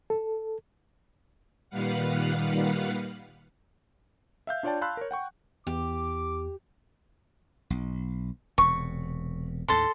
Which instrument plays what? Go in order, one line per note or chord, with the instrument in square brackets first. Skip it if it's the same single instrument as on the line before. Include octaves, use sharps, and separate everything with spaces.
[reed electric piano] A4
[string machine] A#2 D#3 G3 B4 F5 F#5
[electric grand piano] E5 F5 G6
D4 F4 C#5 D5 G5 A5
F5 A5 B5 C6 E6 F#6
A#4 C#5
F#5 G5 C#6
[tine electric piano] E2 [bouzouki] G4 [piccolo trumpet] D6
[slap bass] B1
[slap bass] E1 C3 [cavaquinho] C#6
[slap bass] D#2 A2 [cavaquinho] A4 C6